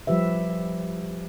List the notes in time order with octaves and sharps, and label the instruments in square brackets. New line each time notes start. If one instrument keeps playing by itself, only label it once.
[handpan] F3 G3 G4 B4 E5